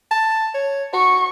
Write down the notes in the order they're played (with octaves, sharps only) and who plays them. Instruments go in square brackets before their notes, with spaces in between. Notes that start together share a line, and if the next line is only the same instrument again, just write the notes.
[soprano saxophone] A5
C#5
[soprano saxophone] F#4 [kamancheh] C#6